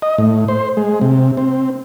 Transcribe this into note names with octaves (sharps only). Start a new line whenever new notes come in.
D#5
A2
C5
G#3
C3
C4